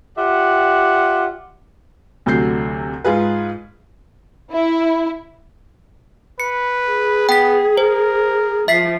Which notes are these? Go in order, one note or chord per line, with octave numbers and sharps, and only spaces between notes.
F4 G4 D5 E5 F#5
D2 C3 F#3 G6 C7
G#2 F4 G#4 B4
E4
B4 C#7
G#4
B3 G5 B6
A#4 C5
F3 E5 B6 C7